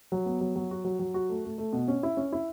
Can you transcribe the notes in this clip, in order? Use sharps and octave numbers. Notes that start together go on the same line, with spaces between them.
F#3
B3
F#3
F#3
F#4
F#3
F#3
F#4
A3
A3
A3
B2
C#4
E4
C#4
E4